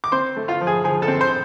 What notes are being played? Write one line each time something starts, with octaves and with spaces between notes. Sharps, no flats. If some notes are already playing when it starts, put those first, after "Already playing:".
D6
C4 C5 C6
A3
F4 F5
F3
G#4 G#5
F3 G#4 G#5
A4 A5
C4
C5 C6